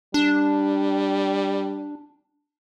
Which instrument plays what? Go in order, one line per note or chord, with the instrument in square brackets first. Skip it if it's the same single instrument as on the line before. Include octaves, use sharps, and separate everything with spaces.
[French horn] G3 [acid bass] D4